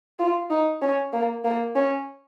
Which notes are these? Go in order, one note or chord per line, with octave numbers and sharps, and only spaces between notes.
F4
D#4
C#4
A#3
A#3
C#4